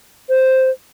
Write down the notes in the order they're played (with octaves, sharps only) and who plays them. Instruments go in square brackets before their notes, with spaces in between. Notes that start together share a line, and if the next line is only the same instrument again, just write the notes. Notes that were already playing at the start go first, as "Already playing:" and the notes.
[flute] C5